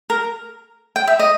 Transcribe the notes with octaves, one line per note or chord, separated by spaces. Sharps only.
A#4
G5
E5
D#5